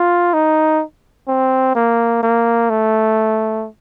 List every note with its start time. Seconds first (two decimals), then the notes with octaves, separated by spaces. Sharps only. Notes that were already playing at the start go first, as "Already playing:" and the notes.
Already playing: F4
0.34 D#4
1.28 C4
1.75 A#3
2.23 A#3
2.70 A3